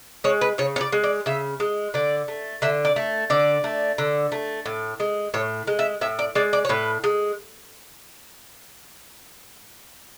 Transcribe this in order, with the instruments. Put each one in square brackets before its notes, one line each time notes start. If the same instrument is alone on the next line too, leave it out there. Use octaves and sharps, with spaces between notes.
[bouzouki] G#3 C#5
B4
C#3 C#5
C#5
D5
G#3
D5
C#3 E5
G#3
D3 D5
A3
D3 E5
D5
A3
D3 D5
A3
D3
A3
A2
G#3
A2 C#5
G#3
E5
A2 E5
D5
G#3 D5
D5
C#5
A2 B4
G#3